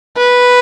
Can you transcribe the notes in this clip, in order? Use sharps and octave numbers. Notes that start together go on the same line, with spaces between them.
B4